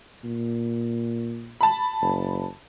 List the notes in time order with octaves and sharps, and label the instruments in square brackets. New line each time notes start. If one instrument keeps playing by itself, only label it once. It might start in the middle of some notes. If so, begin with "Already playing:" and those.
[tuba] A#2
[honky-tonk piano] A5 B5
[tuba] F#1